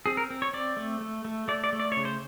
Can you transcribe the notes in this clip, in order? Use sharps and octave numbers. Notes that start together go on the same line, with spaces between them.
C4 G#4
A#4
C4
C#5
C4 D5
A3
A3
A3
A3 D5
D5
A3
D5
C#3 C#5
C5